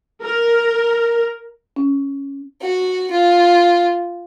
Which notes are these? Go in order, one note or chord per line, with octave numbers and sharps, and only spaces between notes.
A#4
C#4
F#4
F4